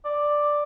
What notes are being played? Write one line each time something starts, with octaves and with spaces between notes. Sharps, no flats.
D5